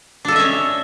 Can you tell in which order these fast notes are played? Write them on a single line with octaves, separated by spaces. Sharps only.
D4 A4 D#5 E5 C#4